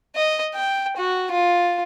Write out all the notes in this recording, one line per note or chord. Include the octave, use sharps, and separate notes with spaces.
D#5
G5
F#4
F4